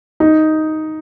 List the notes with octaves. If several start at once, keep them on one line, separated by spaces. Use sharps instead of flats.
D#4